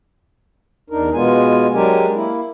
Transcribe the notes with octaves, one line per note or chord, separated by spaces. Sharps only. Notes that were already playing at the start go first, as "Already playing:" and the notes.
E2 D4 D#4 A#4
B2 G#3 B3 F4 G#5
F#3 G#3 D4 G4 A#4 G#5
A#3 E4